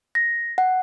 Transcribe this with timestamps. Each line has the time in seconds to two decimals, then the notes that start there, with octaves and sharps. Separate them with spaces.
0.15 A#6
0.58 F#5